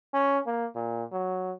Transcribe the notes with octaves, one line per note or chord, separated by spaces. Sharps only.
C#4
A#3
A#2
F#3